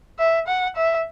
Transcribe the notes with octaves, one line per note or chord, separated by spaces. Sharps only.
E5
F#5
E5